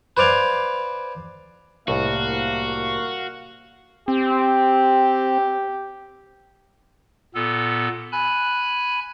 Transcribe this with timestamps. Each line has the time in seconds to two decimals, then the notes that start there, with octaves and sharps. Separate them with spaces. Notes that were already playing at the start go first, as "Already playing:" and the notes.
0.17 B4 C5 D5 F5 G#5
1.88 C2 A2 A#3 F#4 F5
4.08 C4 G4
7.35 A#2 B3 A4
8.12 G#5 B5 F#6